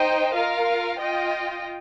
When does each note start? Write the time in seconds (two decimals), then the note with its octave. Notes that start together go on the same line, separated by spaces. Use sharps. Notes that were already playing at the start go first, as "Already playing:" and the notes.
Already playing: D#4 C5 D#5 G5
0.34 F4 A#4 F5
0.98 F4 D#5 G5